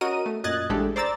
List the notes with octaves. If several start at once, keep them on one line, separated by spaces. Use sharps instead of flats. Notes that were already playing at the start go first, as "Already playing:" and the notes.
C#4 F#4 A#4 D#5 D#7
A3
F#2 A#2 D#5 F#6 G#6 A6
A1 A2 G#3 D4 G4 A4
C5 D5 A#5 E6 A6